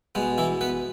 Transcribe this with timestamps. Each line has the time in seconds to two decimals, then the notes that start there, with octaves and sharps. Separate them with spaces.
0.15 B2 G#3 B3
0.38 E3 E4
0.61 B3 B4